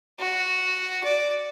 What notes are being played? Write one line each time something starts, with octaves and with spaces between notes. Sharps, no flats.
F#4
D5